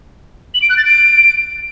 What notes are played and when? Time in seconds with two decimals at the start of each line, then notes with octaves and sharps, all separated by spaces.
0.54 F#7
0.62 D7
0.70 F#6
0.77 A6
0.85 D7